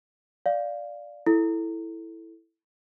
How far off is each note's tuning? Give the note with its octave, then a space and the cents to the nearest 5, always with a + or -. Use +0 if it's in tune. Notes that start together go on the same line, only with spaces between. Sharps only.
D5 +0 F5 +0
E4 +0 A4 +0